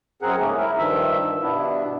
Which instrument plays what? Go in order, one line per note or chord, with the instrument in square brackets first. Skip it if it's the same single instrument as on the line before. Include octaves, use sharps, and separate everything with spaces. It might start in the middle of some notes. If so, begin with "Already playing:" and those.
[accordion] F#2 C4 G#4 A#4 F#5
G#2 C#3 A3 A#3 C#4
E4 A#4
G2 D#3 F3 E5
G2 B2 B3 D4 E4